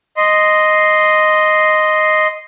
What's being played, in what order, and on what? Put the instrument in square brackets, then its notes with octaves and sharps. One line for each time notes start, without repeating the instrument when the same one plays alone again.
[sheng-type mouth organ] D#5 C6